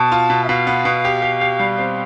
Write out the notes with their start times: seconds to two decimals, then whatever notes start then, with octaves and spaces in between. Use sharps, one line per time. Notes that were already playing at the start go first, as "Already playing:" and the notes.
Already playing: B2 A5
0.12 F4
0.30 B2
0.44 E5
0.48 B2 F5
0.67 B3
0.85 B2
1.05 G4
1.22 G4
1.41 G4
1.59 G3
1.78 C4